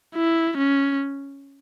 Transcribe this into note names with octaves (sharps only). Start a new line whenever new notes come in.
E4
C#4